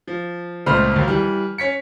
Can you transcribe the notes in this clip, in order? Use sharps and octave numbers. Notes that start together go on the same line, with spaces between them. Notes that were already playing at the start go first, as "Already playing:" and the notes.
F3
C#2 A#2 A3 C5 B5 F6
D#2 F#3
E3 G3
C#4 B6 C#7